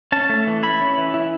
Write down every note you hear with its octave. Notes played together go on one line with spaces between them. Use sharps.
C#4 A5
A3
E3
E4 B5
C#4
E3
E4